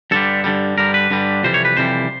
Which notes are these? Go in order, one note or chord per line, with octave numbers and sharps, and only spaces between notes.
G2 D3 G3 A4
G2 D3 G3
G2 D3 G3 A#4
B4
G2 D3 G3
F2 C3 E3 G3 C5
C#5
B4
F2 C3 E3 G3 C5